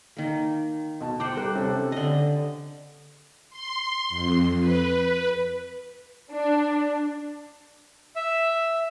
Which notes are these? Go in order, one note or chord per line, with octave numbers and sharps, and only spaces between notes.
D#3 A#3
B2 A5
C5 F#5 G5 D6
G3 A#4 F#6
C3 C#4 A4
D3 D#5
C6
F2
B4
D4
E5